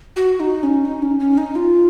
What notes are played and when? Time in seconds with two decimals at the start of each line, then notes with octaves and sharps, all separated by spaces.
0.16 F#4
0.40 D#4
0.63 C#4
0.85 D#4
1.02 C#4
1.20 C#4
1.37 D#4
1.55 F4